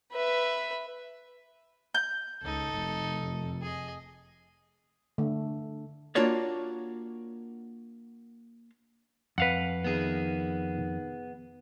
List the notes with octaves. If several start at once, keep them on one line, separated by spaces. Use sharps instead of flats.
B4 E5
G6
C#2 D#4 A4
F1
G#4 D#5
D3 A3
A#3 D4 F4 F#4 C#5 D5
F2 B4 F5 F#5
D#3 B3 G#4